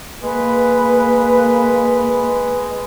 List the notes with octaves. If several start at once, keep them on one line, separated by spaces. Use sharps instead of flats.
G#3 A#3 B4